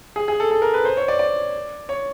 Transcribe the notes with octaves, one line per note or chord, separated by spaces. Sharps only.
G#4
G#4
A4
A4
A#4
B4
C5
C#5
D5
D5
C#5